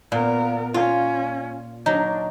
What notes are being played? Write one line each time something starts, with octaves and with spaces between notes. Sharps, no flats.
A#2 B3 A#4
C#4 F4
F#3 D4 D#4